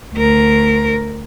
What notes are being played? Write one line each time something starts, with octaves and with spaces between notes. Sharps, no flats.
D2 A#4